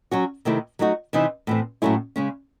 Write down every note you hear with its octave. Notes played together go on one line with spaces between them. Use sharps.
F#3 C#4 F#4
C3 D#3 A3 C4 E4
F#3 A3 D#4 F#4
C3 E3 C4 D#4
A2 E3 C4
A2 F#3 A3 C#4 E4
C#3 G#3 C#4